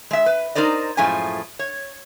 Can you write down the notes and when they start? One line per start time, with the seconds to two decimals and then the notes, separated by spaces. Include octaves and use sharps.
0.11 G#3 E5
0.26 B4
0.55 D#4 A#4 C5 D5 D#5
0.97 F#2 A2 F3 G#3 A3 G#5
1.59 C#5